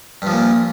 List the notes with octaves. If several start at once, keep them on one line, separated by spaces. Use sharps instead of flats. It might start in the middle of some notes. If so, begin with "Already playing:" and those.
G2 A#2 F3